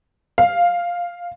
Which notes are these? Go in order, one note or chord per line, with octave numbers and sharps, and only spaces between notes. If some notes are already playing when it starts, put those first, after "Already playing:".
F5